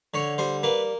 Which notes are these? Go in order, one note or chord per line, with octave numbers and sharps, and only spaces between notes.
D3 C#5
G3 C5
A#3 B4